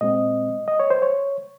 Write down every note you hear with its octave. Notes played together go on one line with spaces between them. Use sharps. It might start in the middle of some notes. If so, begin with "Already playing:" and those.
A#2 G#3 C4 D#5
D#5
C#5
C5
C#5